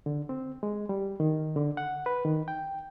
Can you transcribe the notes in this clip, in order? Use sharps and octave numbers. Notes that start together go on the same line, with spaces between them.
D3
C4
G#3
G3
D#3
D3
F#5
B4
D#3
G5